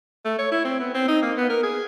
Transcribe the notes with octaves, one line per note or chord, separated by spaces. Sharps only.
A3
C#5
E4
C4
B3
C4
D#4
A#3
B3
A#4
G#4